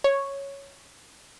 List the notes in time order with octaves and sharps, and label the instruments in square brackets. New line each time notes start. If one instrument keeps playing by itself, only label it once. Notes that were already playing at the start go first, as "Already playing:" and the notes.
[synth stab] C#5